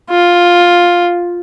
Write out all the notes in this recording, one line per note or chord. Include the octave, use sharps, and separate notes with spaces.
F4